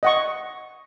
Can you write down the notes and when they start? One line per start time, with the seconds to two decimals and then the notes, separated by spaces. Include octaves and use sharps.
0.03 D#5 F#5 C#6